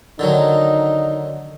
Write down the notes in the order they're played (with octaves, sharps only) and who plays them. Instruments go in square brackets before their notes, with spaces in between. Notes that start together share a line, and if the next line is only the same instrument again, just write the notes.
[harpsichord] D3 D#3 F#3 [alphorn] D#4